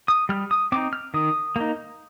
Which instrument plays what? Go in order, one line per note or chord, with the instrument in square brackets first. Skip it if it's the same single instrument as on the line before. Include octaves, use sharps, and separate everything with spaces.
[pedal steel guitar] D#6
G3 F6
D#6
C4 D#4 D6
F6
D#3 D#6
A#3 D#4